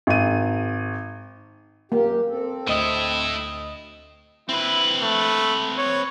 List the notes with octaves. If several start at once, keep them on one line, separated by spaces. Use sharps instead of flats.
G#1 D#7
F#2 A#3 G4
C4 A4
D2 A2 E4 D#5 D#6
C4 E4 B4
A3
C#5